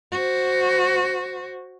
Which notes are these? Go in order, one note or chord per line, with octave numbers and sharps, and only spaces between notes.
F#4 C5